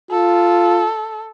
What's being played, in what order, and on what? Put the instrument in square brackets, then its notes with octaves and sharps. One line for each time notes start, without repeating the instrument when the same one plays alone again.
[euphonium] F4 [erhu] A4